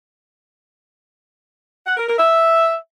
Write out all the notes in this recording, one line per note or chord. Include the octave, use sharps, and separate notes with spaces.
F#5
A#4
A#4
E5